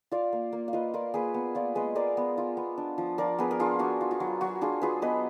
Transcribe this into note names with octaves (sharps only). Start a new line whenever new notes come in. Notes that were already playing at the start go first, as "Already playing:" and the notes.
F4 D5 F5
A#3
A#3
F5
F4 B4 D#5
F4 A#4 D5
A#3 G#4 B4
B3
F4 D5 F5
G#3 B4 D#5
G#3 A#4 D5
B3
F4
B3
D4
F3
F3 A#4 D5
B3 G#4 B4
A#4
D4 F4 G#4
D4 F#4
F4
F4
F#3
F#3 F#4
D4 F4 G#4
F4 G#4 B4
B3 B4 D#5